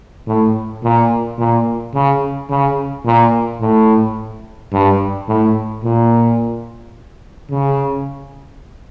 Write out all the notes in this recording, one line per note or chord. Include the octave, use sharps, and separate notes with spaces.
A2
A#2
A#2
C#3
C#3
A#2
A2
G2
A2
A#2
C#3